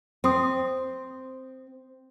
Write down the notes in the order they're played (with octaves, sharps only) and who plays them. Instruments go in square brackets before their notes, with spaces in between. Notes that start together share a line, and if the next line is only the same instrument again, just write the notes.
[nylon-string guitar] C4 [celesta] C5 C6 D#6